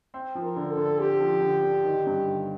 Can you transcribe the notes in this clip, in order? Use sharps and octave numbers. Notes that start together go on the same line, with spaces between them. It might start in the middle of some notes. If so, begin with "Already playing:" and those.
C4
F3
A#4
D3
A4
D3
C4 G4
F3
D3
D3
D#3
G2
G1